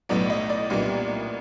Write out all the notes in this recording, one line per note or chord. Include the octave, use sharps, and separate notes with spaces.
B1 A2 F#3 B3 D5
D#5
D5
C2 A#2 G3 B3 D4